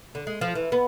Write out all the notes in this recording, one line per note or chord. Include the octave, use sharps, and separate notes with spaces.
D3
G#3
F3
E3
B3